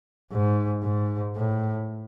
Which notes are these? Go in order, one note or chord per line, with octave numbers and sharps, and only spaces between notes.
G#2
G#2
A2